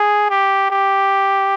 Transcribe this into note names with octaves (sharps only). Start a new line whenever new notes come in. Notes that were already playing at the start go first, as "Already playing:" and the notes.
Already playing: G#4
G4
G4